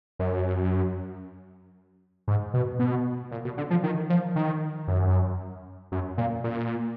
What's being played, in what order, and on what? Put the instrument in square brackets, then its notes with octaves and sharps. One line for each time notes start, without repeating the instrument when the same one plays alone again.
[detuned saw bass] F#2
G#2
B2
B2
A#2
B2
D3
F3
D#3
F3
D#3
F#2
F#2
A#2
A#2